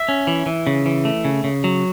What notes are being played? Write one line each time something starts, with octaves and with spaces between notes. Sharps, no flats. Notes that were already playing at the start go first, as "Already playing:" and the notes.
Already playing: E5
C#4
E3
E3
C#3
E3
A3
C#3
C#3
F#3